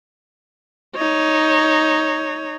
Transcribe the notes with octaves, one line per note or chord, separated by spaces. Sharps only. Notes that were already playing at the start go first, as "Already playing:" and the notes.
D#4 C#5